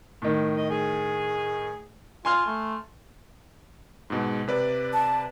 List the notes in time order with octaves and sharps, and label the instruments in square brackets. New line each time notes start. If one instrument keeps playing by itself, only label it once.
[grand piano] A2 D#3
[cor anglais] D#5
G#4
[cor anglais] F4 [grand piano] G#5 C6 F6
[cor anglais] A3
[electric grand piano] G#2 B2 G#3
C3 B4 D5
[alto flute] A5